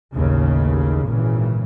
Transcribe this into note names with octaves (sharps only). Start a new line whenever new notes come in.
A1 D#2 C#3
G#1 A#2 C#3 E3